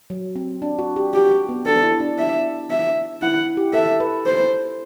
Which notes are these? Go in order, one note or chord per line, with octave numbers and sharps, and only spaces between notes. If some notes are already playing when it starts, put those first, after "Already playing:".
F#3
C4
D4
F#4
G4
F#4 G4
G4
B3
D4 A4
E4
D4
E5
E5
E4 F#5
G4
A4 E5
B4
C5